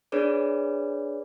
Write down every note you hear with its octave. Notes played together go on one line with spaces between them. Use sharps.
D4 G#4 B4 C#5 D5